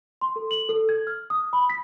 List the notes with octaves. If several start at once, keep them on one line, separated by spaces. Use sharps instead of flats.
C6
A4
F#7
A4
G#6
F6
D#6
B5
B6